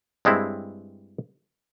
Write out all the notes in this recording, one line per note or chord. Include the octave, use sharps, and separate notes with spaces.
G2 G#3 C4 E4